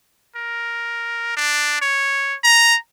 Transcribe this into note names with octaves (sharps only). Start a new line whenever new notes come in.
A#4
D4
C#5
A#5